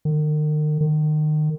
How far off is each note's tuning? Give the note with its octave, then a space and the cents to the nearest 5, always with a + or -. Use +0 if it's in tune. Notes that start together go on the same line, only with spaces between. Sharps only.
D#3 -40
D#3 -30